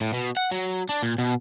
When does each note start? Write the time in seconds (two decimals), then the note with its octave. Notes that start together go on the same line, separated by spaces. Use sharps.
0.01 A2
0.14 B2
0.37 F#5
0.51 F#3
0.89 D4
1.03 A#2
1.18 B2